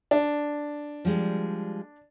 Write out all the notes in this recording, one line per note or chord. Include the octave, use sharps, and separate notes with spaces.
D4
F3 G3 G#3